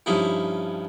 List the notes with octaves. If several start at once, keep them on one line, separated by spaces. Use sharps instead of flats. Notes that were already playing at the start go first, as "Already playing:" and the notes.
G2 F3 C#4 D#4 E4